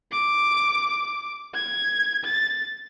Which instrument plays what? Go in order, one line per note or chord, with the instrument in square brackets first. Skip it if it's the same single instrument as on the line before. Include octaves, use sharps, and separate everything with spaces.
[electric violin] D6
G#6
A6